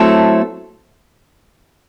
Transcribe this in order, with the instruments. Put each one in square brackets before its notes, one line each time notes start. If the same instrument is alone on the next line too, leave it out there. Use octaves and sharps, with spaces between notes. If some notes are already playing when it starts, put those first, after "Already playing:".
Already playing: [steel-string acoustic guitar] F#3 A3 C4 E4 A4